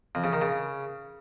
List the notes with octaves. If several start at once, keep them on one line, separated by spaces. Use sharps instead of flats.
F2
C#3
D#3
C#3